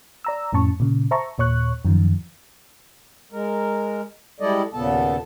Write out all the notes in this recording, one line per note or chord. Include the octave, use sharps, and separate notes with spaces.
D5 A#5 E6
F2 A2 C#4 A5 C#6
A#2 C#3
C5 E5 A5 A#5 C#6
D#2 A#2 C#5 C#6 F#6
F#2 D#3 F3
G#3 A#4
G3 G#3 E4 A4 D5 D#5
D#2 A#2 C#3 B3 A4 A5